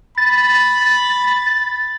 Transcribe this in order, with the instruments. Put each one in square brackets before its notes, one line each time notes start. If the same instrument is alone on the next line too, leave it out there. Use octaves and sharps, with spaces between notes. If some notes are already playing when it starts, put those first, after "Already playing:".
[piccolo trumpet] B5 [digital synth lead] A6